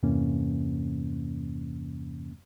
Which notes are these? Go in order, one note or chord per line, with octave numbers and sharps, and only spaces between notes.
E2 G2 C3 E3 A#3 C#4